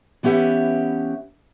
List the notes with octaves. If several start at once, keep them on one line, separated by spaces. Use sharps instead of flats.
E3 B3 C#4 G4 E5 F#5